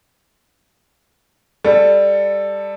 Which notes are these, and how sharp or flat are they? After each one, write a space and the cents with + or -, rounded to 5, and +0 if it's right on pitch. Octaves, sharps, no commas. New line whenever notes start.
G3 +15 A4 +10